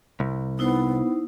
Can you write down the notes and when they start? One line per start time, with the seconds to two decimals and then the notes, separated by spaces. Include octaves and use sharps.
0.20 C2
0.59 B3 D#4 E4 C5